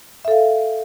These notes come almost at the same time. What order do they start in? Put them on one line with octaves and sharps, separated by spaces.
E5 A4 F5